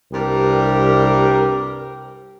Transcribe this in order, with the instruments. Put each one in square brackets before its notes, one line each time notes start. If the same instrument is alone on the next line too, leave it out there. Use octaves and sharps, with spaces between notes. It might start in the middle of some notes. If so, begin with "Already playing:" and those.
[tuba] C2 [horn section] G2 G4 A#4